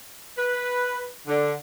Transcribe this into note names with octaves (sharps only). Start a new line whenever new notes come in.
B4
D3